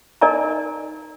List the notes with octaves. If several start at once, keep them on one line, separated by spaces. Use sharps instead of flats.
D#4 A#4 D5 D#5 G#5 A#5